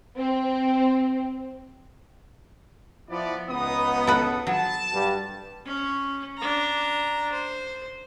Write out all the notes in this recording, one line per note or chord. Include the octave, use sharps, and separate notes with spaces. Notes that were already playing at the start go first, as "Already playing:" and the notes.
C4
F3 B3 E4 D5
C#2 B3 D#4 D#6
A4 B4
F#3 A5
G2
C#4
D4 A#5
C5